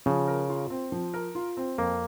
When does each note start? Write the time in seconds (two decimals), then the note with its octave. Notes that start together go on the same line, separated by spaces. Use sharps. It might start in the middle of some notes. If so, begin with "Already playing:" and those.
0.06 C#3 F3
0.28 A#4
0.49 F4
0.70 C4
0.92 F3
1.14 A#4
1.35 F4
1.57 C4
1.78 F2 A#3